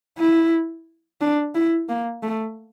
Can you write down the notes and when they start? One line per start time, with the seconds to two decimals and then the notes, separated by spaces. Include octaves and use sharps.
0.18 E4
1.21 D4
1.55 E4
1.89 A#3
2.23 A3